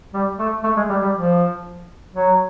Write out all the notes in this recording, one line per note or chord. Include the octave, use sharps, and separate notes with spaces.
G3
A3
A3
G#3
G3
G3
F3
F#3